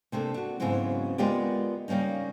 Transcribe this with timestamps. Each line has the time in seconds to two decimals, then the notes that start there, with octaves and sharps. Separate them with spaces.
0.12 C3 A3 A#3 D4
0.34 D4 F#4
0.60 G#2 C#3 F#3 B3 C4 E4
1.18 G#3 B3 F4 G4 A#4 D5
1.88 C#3 G3 A#3 C#4 D#4